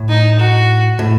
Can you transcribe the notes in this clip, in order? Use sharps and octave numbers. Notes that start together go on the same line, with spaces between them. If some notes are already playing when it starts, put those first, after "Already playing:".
Already playing: A2
D#4
F#4
A2